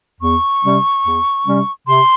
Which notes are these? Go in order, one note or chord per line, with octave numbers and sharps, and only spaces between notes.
E2 C#6
C3 G3 C#4
E2
C3 G3 C#4
C3 C6